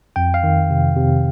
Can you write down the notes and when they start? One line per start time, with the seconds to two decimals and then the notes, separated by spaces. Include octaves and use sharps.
0.16 F2 G5
0.34 F5
0.44 D#3
0.70 C3
0.97 C3